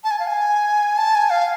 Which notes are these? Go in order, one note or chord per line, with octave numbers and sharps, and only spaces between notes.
A5
G#5
F5
G#5
A5
G#5
F5